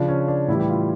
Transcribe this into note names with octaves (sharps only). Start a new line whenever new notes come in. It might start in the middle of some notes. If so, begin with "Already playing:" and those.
Already playing: C#3 F3 D4
C#4
D4
A2 E3 G3 E4
G4
F4